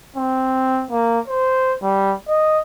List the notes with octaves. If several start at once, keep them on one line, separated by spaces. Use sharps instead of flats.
C4
A#3
C5
G3
D#5